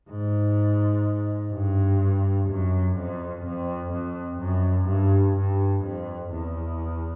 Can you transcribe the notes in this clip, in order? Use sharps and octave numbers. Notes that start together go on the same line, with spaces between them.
G#2
G2
F#2
F2
F2
F2
F#2
G2
G2
F2
E2